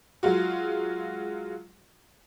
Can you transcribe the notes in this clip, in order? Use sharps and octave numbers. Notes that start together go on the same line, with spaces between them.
F#3 G#3 F4 F#4